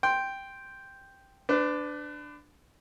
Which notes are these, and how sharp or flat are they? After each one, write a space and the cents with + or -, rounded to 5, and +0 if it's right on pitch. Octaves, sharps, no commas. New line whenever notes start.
G5 +0 C6 +0
D4 +5 B4 +35